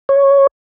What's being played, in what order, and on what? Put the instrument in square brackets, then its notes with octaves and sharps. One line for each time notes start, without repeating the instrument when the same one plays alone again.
[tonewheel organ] C#5